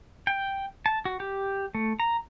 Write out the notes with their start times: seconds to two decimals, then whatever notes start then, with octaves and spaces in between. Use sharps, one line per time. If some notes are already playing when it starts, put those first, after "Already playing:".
0.27 G5
0.86 A5
1.05 F#4
1.20 G4
1.75 A3
2.00 A#5